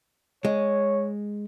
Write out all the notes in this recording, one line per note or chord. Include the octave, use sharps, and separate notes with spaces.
G#3 C#5